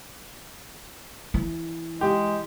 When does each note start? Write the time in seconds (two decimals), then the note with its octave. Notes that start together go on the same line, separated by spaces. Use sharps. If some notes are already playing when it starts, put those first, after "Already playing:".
1.34 E3
2.01 G#3 G4